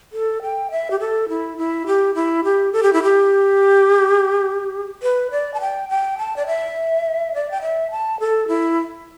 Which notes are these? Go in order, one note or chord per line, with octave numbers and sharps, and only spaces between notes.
A4
G5
E5
G4
A4
E4
E4
G4
E4
G4
A4
G4
E4
G4
B4
D5
A5
G5
G5
A5
D5
E5
D5
G5
E5
A5
A4
E4